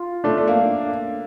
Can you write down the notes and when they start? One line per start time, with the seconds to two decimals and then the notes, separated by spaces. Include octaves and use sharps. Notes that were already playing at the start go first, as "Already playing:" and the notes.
Already playing: F4
0.24 A3 D4
0.38 A3
0.48 A#3